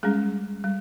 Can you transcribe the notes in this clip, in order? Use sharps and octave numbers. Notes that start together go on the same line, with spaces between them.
G3 G#3 C#4 G#4
G3